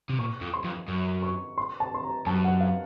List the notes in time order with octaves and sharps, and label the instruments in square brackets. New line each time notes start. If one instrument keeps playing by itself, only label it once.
[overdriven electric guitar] C3
[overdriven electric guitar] A#2 [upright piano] C#6
[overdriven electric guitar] F2
[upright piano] C6
[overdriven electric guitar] F2
F#2
[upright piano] C#6
C6
A5
C6
A#5
[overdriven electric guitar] F#2 [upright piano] A5
[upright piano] F#5
F5